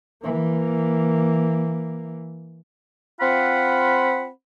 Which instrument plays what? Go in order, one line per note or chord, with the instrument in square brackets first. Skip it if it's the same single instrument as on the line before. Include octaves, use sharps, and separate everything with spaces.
[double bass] E3 A#3
[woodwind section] C4 F4 F#5 B5